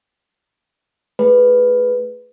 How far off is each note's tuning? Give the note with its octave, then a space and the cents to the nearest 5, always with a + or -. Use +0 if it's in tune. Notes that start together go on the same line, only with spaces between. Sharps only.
A3 +0 G#4 +0 B4 +0